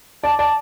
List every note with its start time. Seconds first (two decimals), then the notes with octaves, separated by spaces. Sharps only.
0.24 D5 A5
0.39 D5 A5